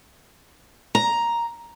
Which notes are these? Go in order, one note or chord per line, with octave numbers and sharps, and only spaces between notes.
A#5